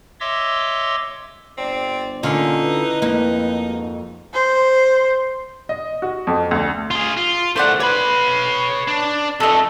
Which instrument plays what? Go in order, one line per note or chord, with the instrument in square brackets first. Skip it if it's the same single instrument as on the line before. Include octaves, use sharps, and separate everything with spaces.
[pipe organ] C#5 D#5 E5 C6 D6 E6
[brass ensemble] G1 D5 [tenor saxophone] C4
[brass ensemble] A#2 [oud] D3 C#4 F4 [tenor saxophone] D#4
[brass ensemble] E4 B4
[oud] F2 A#3 [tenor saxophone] D#4
[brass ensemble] G#2 F#4
[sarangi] C5
[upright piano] D#5
F#4
F2
D2
[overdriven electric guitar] F4 G#4
F4
[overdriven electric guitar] C2 A3 [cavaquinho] C5 D5 F#5
[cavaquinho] B4 [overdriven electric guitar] C#5 B5
[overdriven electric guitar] D4
[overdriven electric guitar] F2 A3 [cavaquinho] A4 D#5